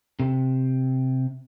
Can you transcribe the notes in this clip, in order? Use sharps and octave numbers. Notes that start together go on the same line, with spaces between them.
C3